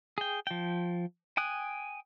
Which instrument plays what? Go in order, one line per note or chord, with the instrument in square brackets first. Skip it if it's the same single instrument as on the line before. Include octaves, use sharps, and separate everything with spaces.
[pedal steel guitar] G#4 G5
F3 G5
G5 G#5 D#6 F#6